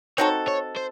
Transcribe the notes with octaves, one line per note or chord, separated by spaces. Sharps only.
C4 D#4 F#4 A4 C#5
C#5
C5